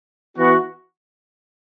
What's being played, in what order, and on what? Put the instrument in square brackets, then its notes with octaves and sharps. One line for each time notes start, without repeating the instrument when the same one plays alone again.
[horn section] E3 B3 F#4